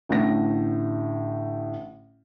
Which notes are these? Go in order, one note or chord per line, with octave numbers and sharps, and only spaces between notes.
A1 A2 D3 A#6